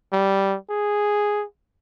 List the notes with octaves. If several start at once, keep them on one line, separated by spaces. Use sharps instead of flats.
G3
G#4